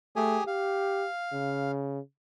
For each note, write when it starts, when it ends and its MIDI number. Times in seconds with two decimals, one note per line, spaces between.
0.16 0.38 57
0.16 0.44 67
0.16 0.44 68
0.16 0.44 80
0.47 1.06 67
0.47 1.72 77
1.33 2.00 49